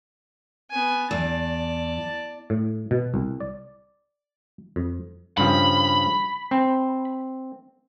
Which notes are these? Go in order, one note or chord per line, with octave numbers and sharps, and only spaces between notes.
B3 G#5
E2 D5 A5
A2
B2
C2
D5
F2
G2 C#3 F3 B5
C4